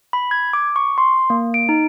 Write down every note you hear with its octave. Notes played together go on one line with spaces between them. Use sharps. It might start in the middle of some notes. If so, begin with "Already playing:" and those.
B5
G#6
D6
C#6
C6
A#3
D7
D#4